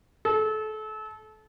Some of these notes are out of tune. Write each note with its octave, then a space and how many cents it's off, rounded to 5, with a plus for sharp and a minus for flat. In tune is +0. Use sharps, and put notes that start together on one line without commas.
A4 -30